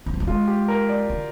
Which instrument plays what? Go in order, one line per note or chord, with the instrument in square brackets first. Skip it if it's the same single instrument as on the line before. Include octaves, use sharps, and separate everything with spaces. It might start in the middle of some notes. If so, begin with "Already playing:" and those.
[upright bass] D#3
F3
G3
[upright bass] G#3 [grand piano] F4
[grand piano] G4
A#4
D5
[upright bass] D3